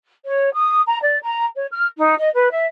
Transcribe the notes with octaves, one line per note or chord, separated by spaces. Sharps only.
C#5
D#6
A#5
D5
A#5
C#5
F6
D#4
D#5
B4
E5